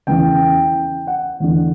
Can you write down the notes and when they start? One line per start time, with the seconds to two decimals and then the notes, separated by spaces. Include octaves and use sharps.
0.07 E2 C#3 E3 G5
1.07 F#5
1.40 E2 D3